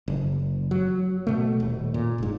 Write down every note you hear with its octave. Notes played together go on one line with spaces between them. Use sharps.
F#1
F#3
B2 A3
D#1
A#2
F1 G#2